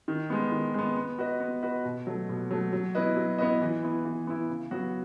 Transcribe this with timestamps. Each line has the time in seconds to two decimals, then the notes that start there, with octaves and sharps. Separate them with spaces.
0.08 D#3
0.30 G#3 B3
0.52 D#3
0.74 G#3 B3
0.96 B3
1.19 F#4 B4 D#5
1.40 B3
1.63 F#4 B4 D#5
1.85 B2
2.07 F#3 A3
2.29 B2
2.51 F#3 A3
2.73 F#3
2.95 B3 E4 B4 D#5
3.17 F#3
3.38 B3 E4 B4 D#5
3.61 E3
3.83 B3 E4
4.05 E3
4.27 B3 E4
4.49 C#3
4.71 F#3 B3 F#4